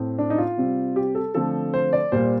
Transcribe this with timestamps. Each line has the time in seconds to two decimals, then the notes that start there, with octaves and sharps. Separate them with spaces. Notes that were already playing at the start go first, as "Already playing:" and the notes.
Already playing: A2 A3 C4
0.18 D4
0.30 D#4
0.38 F4
0.57 C3 G3 C4
0.96 G4
1.15 A4
1.34 D3 F3 A3 C4 A4
1.74 C5
1.93 D5
2.12 A#2 G3 A#3 C5